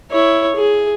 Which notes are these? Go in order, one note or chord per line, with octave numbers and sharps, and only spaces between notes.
E4 C#5
G#4